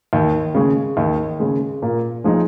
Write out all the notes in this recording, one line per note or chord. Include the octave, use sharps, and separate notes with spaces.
D#2
C#3 G#3
D#2
C#3 G#3
A#2
F3 G#3 D#4